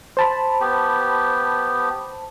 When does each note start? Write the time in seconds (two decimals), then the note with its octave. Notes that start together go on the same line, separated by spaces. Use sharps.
0.17 C5 A5 B5
0.61 B3 G4